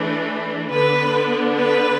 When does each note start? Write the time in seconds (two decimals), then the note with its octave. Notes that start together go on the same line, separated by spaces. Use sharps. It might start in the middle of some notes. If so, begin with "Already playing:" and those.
Already playing: E3 A3 D4
0.72 D3 B3 D4 B4
1.60 B4